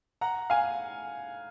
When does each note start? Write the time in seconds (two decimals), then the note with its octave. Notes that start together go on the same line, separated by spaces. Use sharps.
0.21 F#5 A#5
0.50 F5 G#5